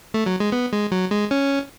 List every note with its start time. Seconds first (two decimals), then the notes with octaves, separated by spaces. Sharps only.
0.14 A3
0.26 F#3
0.40 G#3
0.52 B3
0.72 G#3
0.91 F#3
1.11 G#3
1.31 C#4